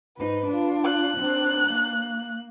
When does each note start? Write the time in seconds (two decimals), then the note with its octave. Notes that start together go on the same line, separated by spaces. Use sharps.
0.18 G#2 D#4 B4
0.47 D4 F4
0.86 F#6
1.18 C4 D4
1.68 A#3